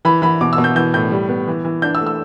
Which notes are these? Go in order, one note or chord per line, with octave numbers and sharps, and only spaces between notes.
E3 B5
E3 B5
B2 D6
E6
B2
G6
E3 G6
A2 G6
G3
B3
E3
E3
D4 G6
E6
A3
E6